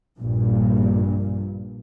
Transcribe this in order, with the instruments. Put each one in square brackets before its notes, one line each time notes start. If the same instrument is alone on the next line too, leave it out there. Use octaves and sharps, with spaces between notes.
[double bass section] A#1 G2 A#2